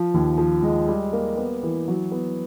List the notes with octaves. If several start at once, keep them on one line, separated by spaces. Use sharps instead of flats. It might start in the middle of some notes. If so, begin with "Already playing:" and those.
Already playing: F3
D#2
F3
G#3
G3
A#3
B3
E3
F#3
B3